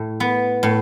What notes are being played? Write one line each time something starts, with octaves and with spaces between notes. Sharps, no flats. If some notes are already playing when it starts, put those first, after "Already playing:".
Already playing: A2
B3
A2